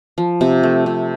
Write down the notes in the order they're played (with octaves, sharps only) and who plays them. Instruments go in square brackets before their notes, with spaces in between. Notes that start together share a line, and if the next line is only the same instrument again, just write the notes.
[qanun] F3
C3
A3
C3